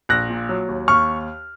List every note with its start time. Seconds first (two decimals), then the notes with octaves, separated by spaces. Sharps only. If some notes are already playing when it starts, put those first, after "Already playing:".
0.09 A#1 F#6 A#6
0.30 A#2
0.49 F#3
0.69 D#2
0.88 D#2 C#6 F6